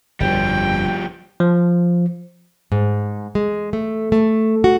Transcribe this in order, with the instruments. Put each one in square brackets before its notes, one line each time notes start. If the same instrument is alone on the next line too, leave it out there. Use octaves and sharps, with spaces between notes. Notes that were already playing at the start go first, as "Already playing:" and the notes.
[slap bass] G1 F2 [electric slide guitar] F3 G3 [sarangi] G5
[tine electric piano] F3
[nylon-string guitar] G#2
G#3
A3
A3
F#4